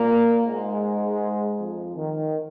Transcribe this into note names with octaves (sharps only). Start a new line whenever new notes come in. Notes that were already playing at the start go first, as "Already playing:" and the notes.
Already playing: A#2 A#3
G#2 G#3
F2 F3
D#3